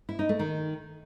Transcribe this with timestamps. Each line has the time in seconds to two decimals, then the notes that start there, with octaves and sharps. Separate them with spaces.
0.09 E4
0.19 D#4
0.29 A3
0.39 D#3